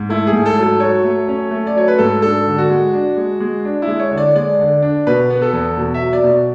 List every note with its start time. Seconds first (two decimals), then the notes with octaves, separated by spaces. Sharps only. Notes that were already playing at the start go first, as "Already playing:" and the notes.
Already playing: G#2
0.09 A3 E4
0.27 G#4
0.33 G#2
0.46 A4
0.58 F#3
0.63 A4
0.80 F#3 C#5
1.04 A3
1.28 C#4
1.51 A3
1.67 D5
1.75 F#3 C#5
1.88 B4
1.99 G#2 A4
2.22 D4 A4
2.46 D3
2.58 F#4
2.70 G#3
2.93 D4
3.17 G#3
3.40 G#3
3.65 D4
3.82 E4
3.88 G#3
4.00 C#5
4.11 D3
4.18 D5
4.35 G#3 D5
4.59 D3
4.82 D4
5.07 B2 B4
5.30 B3
5.42 A4
5.53 E2
5.77 B2
5.94 E5
6.01 F#3
6.13 D5
6.24 B2